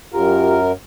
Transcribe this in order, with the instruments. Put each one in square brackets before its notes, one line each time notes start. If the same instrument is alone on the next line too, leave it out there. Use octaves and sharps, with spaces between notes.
[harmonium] F#2 A#4 [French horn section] F4 G4